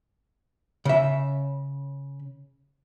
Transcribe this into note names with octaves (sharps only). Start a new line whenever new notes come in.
C#3 E5